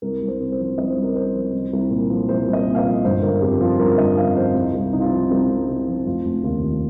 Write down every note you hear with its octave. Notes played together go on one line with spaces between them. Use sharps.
C2 A#4
C2
C5
C3
C5
F3
C2 D#5
C5
C2
A#4
C3 C5
F3
C2
C2
A#2
F3
C2 C5
C2
D#5
A#2
F5
D#5
F3
G1 C5
G1 A#4
F2 G4
F3 F4
G1 A#4
G1 D#5
F2 F5
F3 C5
C2
C2
C3 D#4
F4
F3 D#4
C2 C4
C2
C3
F3
F1 F4
F1
D#2 F4
D#3